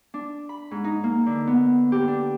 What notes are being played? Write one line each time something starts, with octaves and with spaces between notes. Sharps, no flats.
D4
B5
G#2
D#4
A#3
D3
B3
G4
D4